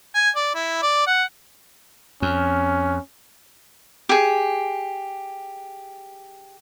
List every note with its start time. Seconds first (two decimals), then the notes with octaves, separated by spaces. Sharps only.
0.15 G#5
0.36 D5
0.55 E4
0.82 D5
1.07 F#5
2.22 F2 C#4
4.09 G4 G#4